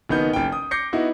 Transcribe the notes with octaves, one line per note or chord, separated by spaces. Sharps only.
F#1 D#3 B3 D#4 G6
F#1 G5
D#6
D6 G6 A#6 C7 C#7
B3 D#4 E4 F#4